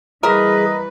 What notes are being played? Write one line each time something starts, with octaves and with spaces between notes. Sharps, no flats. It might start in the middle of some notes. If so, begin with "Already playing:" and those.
E3 G3 A#3 G#4 A#4 B4 D#5